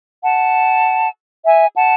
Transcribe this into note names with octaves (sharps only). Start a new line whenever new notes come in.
F#5 A5
E5 G#5
F#5 A5